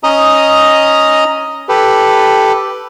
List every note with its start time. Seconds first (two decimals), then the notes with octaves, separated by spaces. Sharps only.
0.04 C#4 D#5 A#5 D#6
1.69 G4 A4 B4